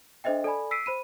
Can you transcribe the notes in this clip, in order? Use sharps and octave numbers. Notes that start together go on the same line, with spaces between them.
D4 A4 C5 D#5 E5 G5
A4 D5 G#5 B5
E6 B6 C7 D7 D#7
C5 B5 D#7